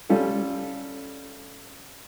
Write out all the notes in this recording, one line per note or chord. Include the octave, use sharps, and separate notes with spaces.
G3 C#4 F4 A4